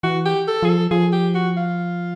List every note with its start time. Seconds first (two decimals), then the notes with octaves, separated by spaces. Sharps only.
0.03 E3 F#4
0.25 G4
0.48 A4
0.63 F3 G#4
0.69 A4
0.91 F3 G#4
1.13 G4
1.35 F#4
1.57 F4